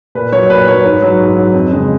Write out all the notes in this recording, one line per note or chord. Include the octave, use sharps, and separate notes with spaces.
A#2 B4
F#3 C#5
A#2 B4
F#3 C#5
G#2 B4
F#3
G#2
F#3
F2
C#3 G#3